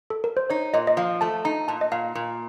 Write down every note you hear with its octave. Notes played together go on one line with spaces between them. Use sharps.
A4
A#4
C5
D#4 C#5
A#2 D#5
D#5
F3 F5
A3 A5
D#4 A#5
A#2 A5
D#5
A#2 F5
A#2